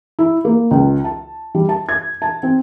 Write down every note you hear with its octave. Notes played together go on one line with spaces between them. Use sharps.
E4
A#3
C#2
A5
G3
A5
G#6
A5
C4